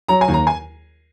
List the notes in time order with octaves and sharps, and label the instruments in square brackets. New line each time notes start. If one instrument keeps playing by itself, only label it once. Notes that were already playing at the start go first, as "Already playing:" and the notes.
[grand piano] F#3 A#5
G#5
D#2
A#5
G#5